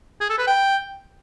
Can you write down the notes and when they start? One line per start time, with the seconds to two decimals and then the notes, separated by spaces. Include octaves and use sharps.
0.21 G#4
0.30 A4
0.38 B4
0.47 G5